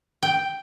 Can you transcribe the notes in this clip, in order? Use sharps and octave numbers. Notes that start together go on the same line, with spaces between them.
G5